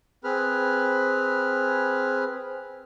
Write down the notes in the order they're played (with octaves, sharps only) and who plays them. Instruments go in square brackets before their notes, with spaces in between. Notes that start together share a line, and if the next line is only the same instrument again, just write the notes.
[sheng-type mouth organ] C4 G#4 B4 B5 F6